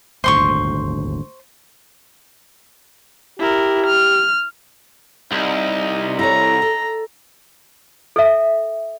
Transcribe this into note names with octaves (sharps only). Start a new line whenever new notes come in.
D#1 G#1 D2 C5 C6 C#6
E4 G4 A#4
F6
C2 D#4
E4 A4 C#5 A#5
A4
A4 E5